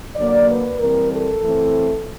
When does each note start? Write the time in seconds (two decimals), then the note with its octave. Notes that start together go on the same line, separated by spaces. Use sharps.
0.16 D3 F#3 A#3 D5
0.48 B4
0.79 E3 G3 C4 A#4
1.11 A4
1.41 E3 A3 C4